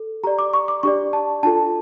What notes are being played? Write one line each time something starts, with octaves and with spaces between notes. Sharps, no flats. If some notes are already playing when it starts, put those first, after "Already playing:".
Already playing: A4
G4 D5 A#5
D6
C#6
D6
D4 G4 D5 C#6
A5
D4 F4 A4 A5